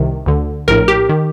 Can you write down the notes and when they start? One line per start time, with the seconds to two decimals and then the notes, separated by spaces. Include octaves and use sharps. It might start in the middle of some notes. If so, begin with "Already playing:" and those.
Already playing: C2 C3 D#3
0.26 D2 D3
0.68 A#1 A2 A#4
0.88 G4
1.09 D#3